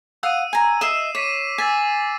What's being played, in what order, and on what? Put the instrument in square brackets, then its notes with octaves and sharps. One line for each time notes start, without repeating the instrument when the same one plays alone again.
[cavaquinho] F5 F#5 D#6 [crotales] E6 D#7
[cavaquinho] G#5 A#5
[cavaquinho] D#5 E5 [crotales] C7 E7
[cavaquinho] C#5 [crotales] D6 B6 D#7
[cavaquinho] G#5 [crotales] E6 A6 B6